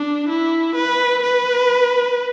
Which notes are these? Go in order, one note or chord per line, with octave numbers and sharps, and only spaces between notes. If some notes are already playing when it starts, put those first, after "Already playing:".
Already playing: D4
E4
B4
B4